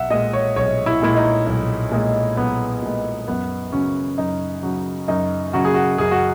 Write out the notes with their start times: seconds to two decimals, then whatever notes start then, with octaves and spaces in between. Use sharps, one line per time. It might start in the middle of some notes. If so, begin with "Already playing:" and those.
Already playing: B1 E5 F#5
0.10 A#2 G#3 D#5
0.33 C#5
0.56 B1 C#5
0.86 E4
1.02 A#2 G#3 E4
1.17 D#4
1.47 B1
1.91 A#2 G#3
2.37 B1 B3
2.82 A#2 G#3
3.28 F#2 B3
3.72 C#3 F#3 C#4
4.18 F#2 D#4
4.63 C#3 F#3
5.08 F#2 D#4
5.53 C#3 F#3 F#4
5.65 G#4
5.74 F#4
5.98 F#2 G#4
6.11 F#4